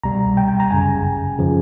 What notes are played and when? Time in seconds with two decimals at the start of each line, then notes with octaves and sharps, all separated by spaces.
0.03 C2 B2 G3 A#5
0.37 G5
0.48 G5
0.60 A#5
0.71 G#1 F#2 C#3 G#5
1.39 C#3 F3